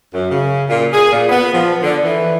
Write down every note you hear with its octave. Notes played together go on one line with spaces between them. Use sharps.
F#2
C#3
A#2
G#4
A#2
B3
F3
D3
E3